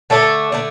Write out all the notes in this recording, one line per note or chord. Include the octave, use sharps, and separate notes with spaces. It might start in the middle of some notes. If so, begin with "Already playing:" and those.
D3 A3 D4 A4
D3 A3 D4